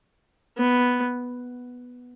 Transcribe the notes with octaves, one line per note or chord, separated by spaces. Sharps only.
B3